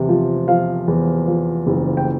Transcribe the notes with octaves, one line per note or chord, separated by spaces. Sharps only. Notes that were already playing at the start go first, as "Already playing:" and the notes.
Already playing: E2 C3
F3
F3 F5
E2
F3
F#1
G5